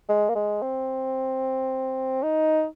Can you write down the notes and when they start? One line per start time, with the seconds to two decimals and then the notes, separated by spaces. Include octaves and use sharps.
0.09 G#3
0.29 A#3
0.35 G#3
0.62 C4
2.23 D#4